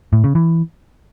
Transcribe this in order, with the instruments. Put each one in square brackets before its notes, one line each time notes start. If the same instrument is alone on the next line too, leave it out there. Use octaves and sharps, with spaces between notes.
[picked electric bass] A2
C#3
E3